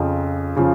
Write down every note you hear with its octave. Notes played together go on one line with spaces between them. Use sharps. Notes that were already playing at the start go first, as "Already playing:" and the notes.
Already playing: F2 C#3 F3
C#3 F3